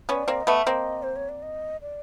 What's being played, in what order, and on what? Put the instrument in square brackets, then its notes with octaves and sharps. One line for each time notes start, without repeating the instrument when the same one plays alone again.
[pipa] B3 C#4 [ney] C#5
[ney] D5
[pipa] A#3 C4
[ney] D#5
[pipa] A3 B3
[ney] E5
[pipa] A#3 C4 [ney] D#5
[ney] C5
C#5
D5
D#5
D5